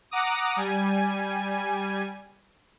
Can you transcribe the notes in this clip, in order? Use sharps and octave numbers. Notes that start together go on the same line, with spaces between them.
F#5 A#5 D6 D#6
G3 G#5